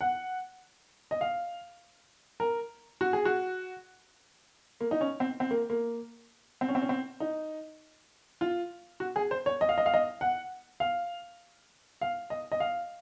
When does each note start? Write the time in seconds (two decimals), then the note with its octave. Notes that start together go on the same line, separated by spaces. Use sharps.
0.01 F#5
1.11 D#5
1.21 F5
2.40 A#4
3.01 F#4
3.13 G#4
3.25 F#4
4.81 A#3
4.91 D#4
5.01 C#4
5.20 C4
5.40 C4
5.51 A#3
5.70 A#3
6.61 C4
6.68 C#4
6.75 C4
6.82 C#4
6.89 C4
7.20 D#4
8.41 F4
9.00 F#4
9.16 G#4
9.31 C5
9.46 C#5
9.61 D#5
9.69 F5
9.78 D#5
9.86 F5
9.94 D#5
10.21 F#5
10.80 F5
12.01 F5
12.30 D#5
12.52 D#5
12.60 F5